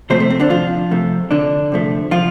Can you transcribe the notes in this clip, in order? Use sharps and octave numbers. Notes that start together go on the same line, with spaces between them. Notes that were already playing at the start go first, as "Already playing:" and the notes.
C3 F3 A3 C4 C5
A3
C4
D3 D4
F3 F4
F2 C3 A3
D3 D4
C3 F3 A3
F3 F4